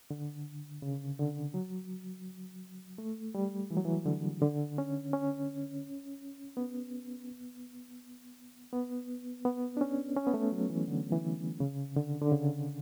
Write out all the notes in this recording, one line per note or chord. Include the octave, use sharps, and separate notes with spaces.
D3
C#3
D3
F#3
A3
G3
E3
F#3
E3
D3
D3
C#4
C#4
B3
B3
B3
D4
C#4
C#4
B3
A3
F#3
E3
D3
E3
C#3
D3
D3
C#3